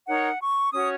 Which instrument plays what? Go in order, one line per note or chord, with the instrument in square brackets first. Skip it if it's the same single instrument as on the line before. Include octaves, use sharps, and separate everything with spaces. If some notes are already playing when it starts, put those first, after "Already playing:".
[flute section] D#4 A#4 C#5 F#5
C#6
C#4 F#4 C#5 D#6